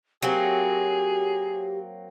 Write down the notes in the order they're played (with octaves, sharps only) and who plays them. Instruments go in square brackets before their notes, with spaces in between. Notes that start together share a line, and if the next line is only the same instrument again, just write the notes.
[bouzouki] F#3 A#3 C4 [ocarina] G4 [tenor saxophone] G#4